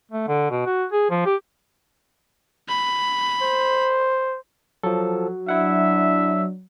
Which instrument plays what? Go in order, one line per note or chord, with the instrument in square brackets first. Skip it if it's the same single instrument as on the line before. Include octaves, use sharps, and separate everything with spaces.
[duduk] A3
D3
B2
F#4
G#4
F3
G4
[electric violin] B5
[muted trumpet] C5
[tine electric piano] F3 A4 [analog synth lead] F#3
[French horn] D4 [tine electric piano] E4 F#5 [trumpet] E5